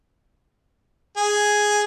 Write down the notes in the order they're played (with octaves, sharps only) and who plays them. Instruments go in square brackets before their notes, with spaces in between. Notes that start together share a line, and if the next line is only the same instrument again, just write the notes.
[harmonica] G#4